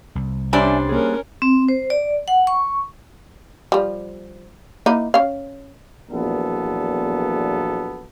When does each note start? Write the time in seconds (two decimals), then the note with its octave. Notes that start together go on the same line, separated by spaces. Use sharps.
0.15 C2
0.53 G3 C#4 D4 C5 D5 E5 G#5
0.89 A#3 C#4 G#4 A#4
1.42 C4
1.68 C5
1.90 D5
2.28 F#5
2.47 C#6
3.72 F3 G3
4.86 A#3 D#4 E4
5.14 C#4 F5
6.10 A#1 E2 A#2 F#3 B3 A4